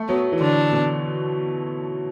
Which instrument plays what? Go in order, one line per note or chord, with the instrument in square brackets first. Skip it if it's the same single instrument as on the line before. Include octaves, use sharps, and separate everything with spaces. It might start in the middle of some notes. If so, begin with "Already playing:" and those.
Already playing: [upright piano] A3
[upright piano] F#3 [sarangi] B3
[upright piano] E3
[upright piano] D3 [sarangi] D4
[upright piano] B2